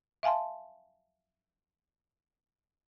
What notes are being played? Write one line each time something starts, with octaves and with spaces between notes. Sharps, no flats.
E5 F5 G#5 A5 C6